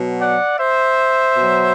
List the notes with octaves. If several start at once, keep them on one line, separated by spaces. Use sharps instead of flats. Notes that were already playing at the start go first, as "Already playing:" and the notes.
Already playing: B2 F#3
D5 F#5
C5 E5
B2 F#3